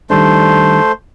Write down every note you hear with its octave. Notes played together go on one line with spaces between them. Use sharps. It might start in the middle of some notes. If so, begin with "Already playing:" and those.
D#3 G3 A3 D4 C5